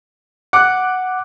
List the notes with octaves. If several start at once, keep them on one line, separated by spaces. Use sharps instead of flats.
F#5 D6 F#6